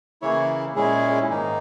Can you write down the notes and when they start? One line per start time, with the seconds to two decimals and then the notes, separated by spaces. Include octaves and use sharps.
0.22 C#3 E3 A#3 E4 C#5
0.76 A#2 G#3 C#4 E4 G#4
1.30 G#2 D#3 A#3 D#4